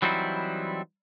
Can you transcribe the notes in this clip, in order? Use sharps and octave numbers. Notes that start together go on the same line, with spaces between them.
E3 F#3 G3 C4 D#4 E4